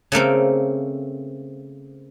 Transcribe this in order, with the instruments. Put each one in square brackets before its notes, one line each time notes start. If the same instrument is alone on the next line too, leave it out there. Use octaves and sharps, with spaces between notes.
[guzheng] C#3 A3 A#3 C4